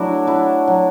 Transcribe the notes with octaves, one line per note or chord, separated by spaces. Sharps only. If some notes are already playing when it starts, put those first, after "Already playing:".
Already playing: F#3 A3 D4 E4 F#4
A3 E4
F#3